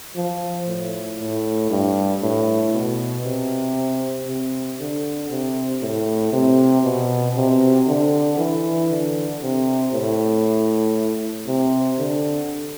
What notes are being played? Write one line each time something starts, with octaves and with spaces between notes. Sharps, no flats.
F3
A2
A2
G2
A2
B2
C3
C3
D3
C3
A2
C3
B2
C3
D3
E3
D3
C3
A2
C3
D3